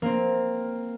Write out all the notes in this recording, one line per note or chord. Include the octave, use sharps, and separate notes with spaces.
A#3 C4